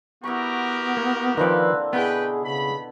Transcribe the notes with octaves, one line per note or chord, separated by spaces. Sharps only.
B3 E4 F#4 G4 A#4 C#6
A#3
D3 D#3 F3 A#3 C4 B4
B2 B3 E4 G#4 B4 G5
C#3 B5